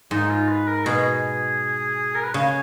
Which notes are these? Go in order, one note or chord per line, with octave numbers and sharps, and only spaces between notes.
G#2 D#4
F4
B4
A#4
B2 G#4
A#4
B4
C#3 C#5